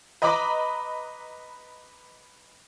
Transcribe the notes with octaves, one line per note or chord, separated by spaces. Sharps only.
B4 D#5 A#5 B5 D6